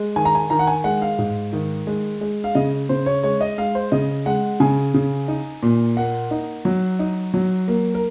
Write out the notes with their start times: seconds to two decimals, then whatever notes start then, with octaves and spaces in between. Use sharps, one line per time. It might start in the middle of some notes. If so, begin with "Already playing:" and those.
Already playing: G#3
0.16 D#3 G#5
0.25 A#5
0.35 G#5
0.50 D#3 A#5
0.59 F#5
0.67 G#5
0.84 G#3 F#5
1.02 F5
1.18 G#2
1.53 D#3
1.87 G#3
2.21 G#3
2.44 F5
2.55 C#3 D#5
2.89 C#3 C5
3.06 C#5
3.23 G#3 C#5
3.41 D#5
3.58 G#3 F5
3.75 C5
3.92 C#3 D#5
4.26 G#3 F#5
4.60 C#3 G#5
4.94 C#3
5.28 D#4
5.63 A#2
5.97 A#3 F#5
6.31 D#4
6.65 F#3
6.99 D#4
7.34 F#3
7.68 A#3
7.94 A#4